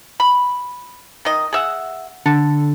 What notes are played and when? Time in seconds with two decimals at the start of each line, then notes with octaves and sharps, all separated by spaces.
0.20 B5
1.25 D#3 D#5
1.53 G#4 E5 F#5
2.26 D3 A4